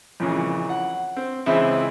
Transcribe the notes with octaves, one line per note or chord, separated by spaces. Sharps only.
F2 A#2 C#3 E3
F#5
C4
C#2 E3 C4 E4 G#4 E5